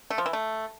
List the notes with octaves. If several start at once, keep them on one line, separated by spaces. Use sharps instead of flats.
A3
F3
E3
A3